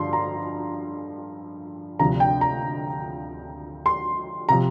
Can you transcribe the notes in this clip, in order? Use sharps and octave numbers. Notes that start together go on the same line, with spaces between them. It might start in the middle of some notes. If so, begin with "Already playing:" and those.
Already playing: G2 D3 F3 C6
A#5
D2 C3 F3 A#5
G5
A#5
C6
C3 F3 A#5